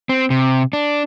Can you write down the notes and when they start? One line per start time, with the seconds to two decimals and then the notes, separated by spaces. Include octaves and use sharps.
0.09 C4
0.30 C3
0.73 D4